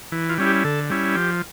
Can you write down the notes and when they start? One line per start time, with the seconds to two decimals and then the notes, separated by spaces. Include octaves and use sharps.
0.12 E3
0.29 F4
0.38 G3 C#4 E4
0.47 G4
0.64 D3 A4
0.90 G3 C#4 E4
1.15 F3 G4